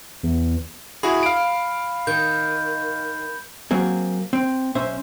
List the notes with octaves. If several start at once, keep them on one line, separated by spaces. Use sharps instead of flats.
E2
E4 F#4 G#4 B5
F5 D7
D#3 G6
F#3 A#3 C4 G#4
C4
B1 C#4 C5 E5